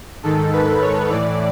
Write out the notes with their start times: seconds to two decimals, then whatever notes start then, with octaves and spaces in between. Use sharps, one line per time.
0.23 G#2 D#3 A4
0.52 B4
0.81 C#5
1.09 A2 E3 D5